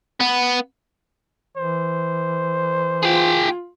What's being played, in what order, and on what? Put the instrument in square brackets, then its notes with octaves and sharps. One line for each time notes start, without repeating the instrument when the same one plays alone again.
[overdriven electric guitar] B3
[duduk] E3 [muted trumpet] C5
[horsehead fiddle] F4 [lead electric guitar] G#4 G5